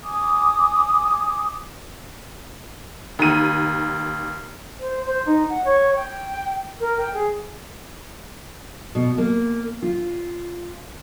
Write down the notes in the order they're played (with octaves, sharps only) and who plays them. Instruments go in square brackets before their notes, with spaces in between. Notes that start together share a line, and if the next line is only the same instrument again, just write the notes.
[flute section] G#5 D6 D#6
[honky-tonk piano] D#2 D#7
[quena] C5
C5
D#4
F#5
C#5
G5
A#4
G5
G#4
[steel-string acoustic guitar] B2
A#3
F4